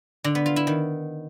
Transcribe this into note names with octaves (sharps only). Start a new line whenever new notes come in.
D3
B3
F4
E4
D#3